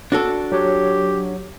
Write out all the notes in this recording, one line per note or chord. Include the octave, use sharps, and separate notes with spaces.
D4 F#4 A4
F#3 G4 C#5